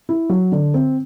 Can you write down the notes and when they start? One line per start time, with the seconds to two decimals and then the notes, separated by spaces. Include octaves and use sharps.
0.09 E4
0.30 F#3
0.52 D3
0.74 C4